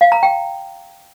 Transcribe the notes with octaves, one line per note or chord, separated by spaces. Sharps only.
F5
A#5
G5